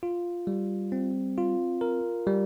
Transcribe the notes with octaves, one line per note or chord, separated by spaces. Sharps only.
F4
G3
C4
F4
A#4
G3